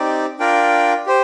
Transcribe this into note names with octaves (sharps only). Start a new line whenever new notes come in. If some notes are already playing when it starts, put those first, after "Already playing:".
Already playing: C4 D#4 G4 D5
D4 F4 A#4 D5 G5
G4 C5